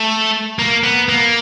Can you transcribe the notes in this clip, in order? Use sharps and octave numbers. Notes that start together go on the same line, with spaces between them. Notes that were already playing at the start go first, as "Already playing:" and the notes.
Already playing: A3
A#3
B3
A#3